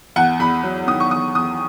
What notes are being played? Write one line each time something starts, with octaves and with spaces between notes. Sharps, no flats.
E2 F#5
E2 B5
F#3
D#3 D#6
C#6
E2 D#6
E2 D#6